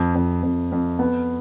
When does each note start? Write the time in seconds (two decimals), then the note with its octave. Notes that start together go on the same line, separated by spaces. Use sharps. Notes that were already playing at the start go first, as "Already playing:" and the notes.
Already playing: F2
0.15 F2
0.43 F2
0.72 F2
0.99 B3